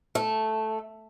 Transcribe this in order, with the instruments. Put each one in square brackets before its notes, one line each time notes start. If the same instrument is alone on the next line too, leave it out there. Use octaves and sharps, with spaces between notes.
[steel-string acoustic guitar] A3